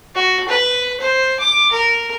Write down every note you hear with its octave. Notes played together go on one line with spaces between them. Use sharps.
F#4
B4
C5
D6
A#4